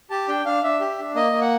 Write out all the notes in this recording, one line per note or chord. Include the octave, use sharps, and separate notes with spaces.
G4 A5
D4 G5
D4 F5
D4 E5
G4
D4
A#3 D#5
A#3
F#5